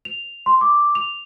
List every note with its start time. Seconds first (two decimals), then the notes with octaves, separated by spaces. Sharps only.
0.05 F7
0.46 C6
0.61 D6
0.95 F7